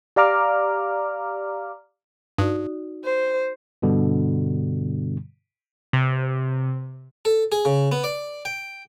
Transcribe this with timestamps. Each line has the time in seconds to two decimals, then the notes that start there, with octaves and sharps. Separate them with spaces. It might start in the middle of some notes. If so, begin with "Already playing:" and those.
0.16 G4 D5 F5 A#5 D6 F6
2.38 G2 D#4 F#4 D5
3.04 C5
3.82 G2 B2 D3 G3
5.93 C3
7.25 A4
7.52 G#4
7.65 C#3
7.92 B3
8.04 D5
8.45 G5